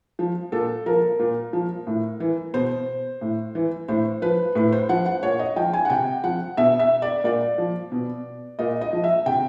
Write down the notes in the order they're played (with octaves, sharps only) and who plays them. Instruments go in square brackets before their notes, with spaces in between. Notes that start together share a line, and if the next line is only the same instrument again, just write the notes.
[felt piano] F3
A#2 A4
F3 A#4
A#2
F3
A2
E3
B2 C5
A2
E3
A2 C5
F3 B4
A2 B4
C5
F3 F#5
F#5
A#2 C#5
D#5
F3 G5
G#5
F#5
C3 G5
F3 F#5
B2 E5
E5
D5
A#2 D5
F3
B2
A#2 D#5
D#5
F3
E5
C3 G5